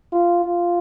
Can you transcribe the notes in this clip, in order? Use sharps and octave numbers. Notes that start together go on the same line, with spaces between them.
F4
F4